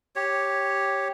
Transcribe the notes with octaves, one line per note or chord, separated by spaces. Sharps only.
G4 C#5